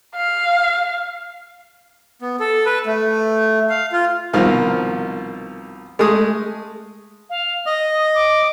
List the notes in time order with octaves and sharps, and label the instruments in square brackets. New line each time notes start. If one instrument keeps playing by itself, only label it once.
[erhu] F5
[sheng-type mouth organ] B3
A4
B4
A3
F5
F4
[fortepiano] C2 B2 D#3 F3 F5
G#3 A3 D#6
[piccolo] F5
[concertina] D#5 [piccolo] D#6
[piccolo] D6